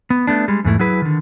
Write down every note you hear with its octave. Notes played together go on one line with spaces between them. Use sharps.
B3
A3 B3 D4
G3 G#3
E2 G#2 A3 E4
F#3 E4 G#4 B4
D3 D#3